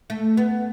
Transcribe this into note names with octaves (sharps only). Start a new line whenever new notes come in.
A3
B3